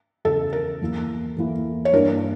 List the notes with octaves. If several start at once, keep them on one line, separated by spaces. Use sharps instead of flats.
E2 C#3 E3 A4
A#4
E2 E3 A#3 E4
E2 E3 A#3 E4
C#5
G2 E3 A#3 D4 A#4